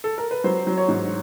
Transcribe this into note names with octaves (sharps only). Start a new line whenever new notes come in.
A4
A#4
B4
F#3 C5
F#3
C#5
G#2